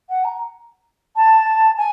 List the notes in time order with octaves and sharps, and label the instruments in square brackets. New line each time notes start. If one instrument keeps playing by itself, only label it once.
[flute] F#5
A#5
A5
G#5